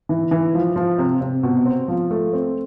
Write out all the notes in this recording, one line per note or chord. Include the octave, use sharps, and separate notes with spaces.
E3
E3
F3
F3
C3
C3
B2
C4
F3
A3
C4